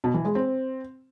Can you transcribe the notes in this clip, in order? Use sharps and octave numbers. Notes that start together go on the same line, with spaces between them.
B2
E3
G#3
C4